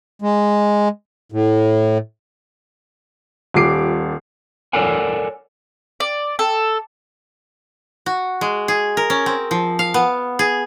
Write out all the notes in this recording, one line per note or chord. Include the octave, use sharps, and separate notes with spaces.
G#3
A2
D#1 A#2 G3 D6 C7 D7
A4 A#4 C#5 D5 F#5 G#5
D5
A4
F#4
G#3
G#4
A#4
C#4
C4
F3
F5
B3
G#4